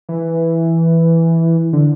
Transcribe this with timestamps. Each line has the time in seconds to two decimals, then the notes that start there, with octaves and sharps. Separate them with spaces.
0.09 E3
1.73 D3